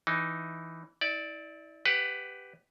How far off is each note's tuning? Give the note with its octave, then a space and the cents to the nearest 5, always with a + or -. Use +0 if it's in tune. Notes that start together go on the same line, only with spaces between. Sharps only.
E3 +0 D#4 +0
E4 -35 D5 +0
G4 +0 B4 +15 F#5 +0